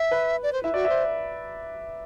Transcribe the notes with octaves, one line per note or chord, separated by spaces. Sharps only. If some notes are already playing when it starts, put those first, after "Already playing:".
Already playing: E5
B4
D5
C5
E4 E5
F#4 D5
E5
C5